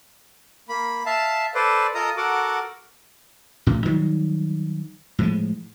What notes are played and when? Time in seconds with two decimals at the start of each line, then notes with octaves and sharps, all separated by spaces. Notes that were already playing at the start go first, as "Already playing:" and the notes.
0.69 A#3 B5
1.06 E5 F5 A5
1.55 A4 B4 C5 D5
1.95 F4 A4 A#4 D#5 A#5 D#6
2.17 F#4 A4 A#4 F#5 D6
3.67 A1 A2
3.85 D#3 F#3 G3
5.19 A2 F3 G#3